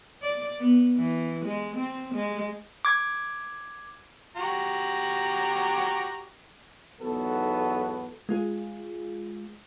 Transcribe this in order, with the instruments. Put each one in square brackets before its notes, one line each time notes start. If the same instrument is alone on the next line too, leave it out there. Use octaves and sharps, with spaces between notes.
[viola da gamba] D5
B3
E3
G#3
C4
G#3
[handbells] D6 G#6
[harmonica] F#4 G4 A#5
[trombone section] B1 E2 G#2 B3 F#4 A4
[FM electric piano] G#3 F4 G#4